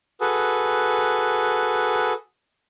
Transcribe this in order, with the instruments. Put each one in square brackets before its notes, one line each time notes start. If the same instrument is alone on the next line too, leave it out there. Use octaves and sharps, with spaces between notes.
[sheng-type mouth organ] F#4 G#4 A4 B4